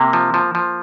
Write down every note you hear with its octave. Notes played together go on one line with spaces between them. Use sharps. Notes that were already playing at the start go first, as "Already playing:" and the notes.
Already playing: C3 A#3
F3
F3
F3